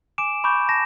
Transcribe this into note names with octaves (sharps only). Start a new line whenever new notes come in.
G#5 D6 D7 E7
B5 C#6 D6 G6
A5 A#6 E7